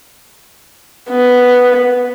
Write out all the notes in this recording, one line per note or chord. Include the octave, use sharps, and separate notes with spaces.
B3